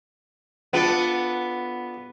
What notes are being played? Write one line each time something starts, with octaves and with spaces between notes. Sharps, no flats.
B3 D4 F4 A4